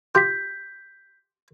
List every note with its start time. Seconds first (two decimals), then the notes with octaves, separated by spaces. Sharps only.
0.15 F4 G4 G6 B6